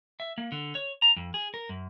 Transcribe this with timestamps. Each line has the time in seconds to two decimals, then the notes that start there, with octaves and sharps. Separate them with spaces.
0.20 E5
0.38 A#3
0.52 D3
0.75 C#5
1.02 A#5
1.16 F2
1.34 G#4
1.54 A#4
1.69 F#2